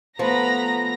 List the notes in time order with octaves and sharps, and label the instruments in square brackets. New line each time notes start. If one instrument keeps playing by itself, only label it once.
[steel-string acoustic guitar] F3 [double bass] A3 B3 [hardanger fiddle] B4 B5 [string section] A#5 A#6